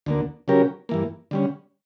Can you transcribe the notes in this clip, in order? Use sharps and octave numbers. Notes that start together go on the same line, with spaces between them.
D2 D3 A#3
C#3 F#3 C#4 G4 A#4
G2 E3 A#3
D3 G3 C#4